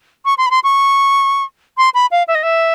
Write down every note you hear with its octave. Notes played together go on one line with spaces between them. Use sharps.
C#6
C6
B5
C6
C#6
C6
B5
F5
E5
D#5
E5